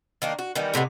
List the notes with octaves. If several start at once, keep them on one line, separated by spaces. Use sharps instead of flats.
D#3 A#3 D4
F#4
D#3 E3 G3 B3
A2 C3 G#3 B3